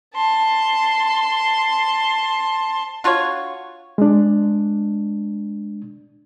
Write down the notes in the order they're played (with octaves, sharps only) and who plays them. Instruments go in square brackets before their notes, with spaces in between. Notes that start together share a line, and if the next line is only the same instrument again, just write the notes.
[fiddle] A5 C6
[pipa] D4 F4 F#4 C#5
[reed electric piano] G#3 D4